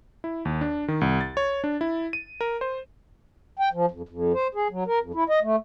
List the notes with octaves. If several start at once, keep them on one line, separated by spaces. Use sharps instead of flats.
E4
D#2
D4
D#3
C2
A6
C#5
D4
E4
D#7
A#4
C5
G5
F3
F2
F2
C5
G#4
F#3
A#4
F2
E4
D#5
A3